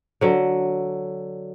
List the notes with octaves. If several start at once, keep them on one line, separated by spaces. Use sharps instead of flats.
D3 F#3